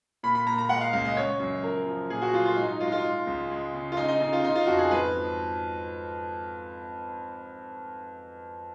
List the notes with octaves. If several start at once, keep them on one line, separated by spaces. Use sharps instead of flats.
A#2 B5
B5
A#2 A#5
A#5
G#3 F#5
F5
C#2 F5
D#5
C#3 C#5
F#2
F3 A#4
F3
A#2 G#4
F#4
F#3 F4
F4
G#2 D#4
D#4
G#3 F4
D#4
F4
G#3
C#2
G#3
C#3
F4
C#3 D#4
D#4
C#3 D#4
F4
C#3 D#4
F4
F2 F#4
G#4
G#2 B4
F3